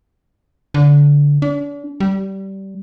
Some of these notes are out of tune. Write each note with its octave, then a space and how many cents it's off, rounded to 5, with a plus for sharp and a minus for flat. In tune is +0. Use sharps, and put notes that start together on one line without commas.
D3 -20
D4 -40
G3 -20